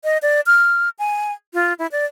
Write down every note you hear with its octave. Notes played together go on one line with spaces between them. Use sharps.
D#5
D5
F6
G#5
F4
E4
D5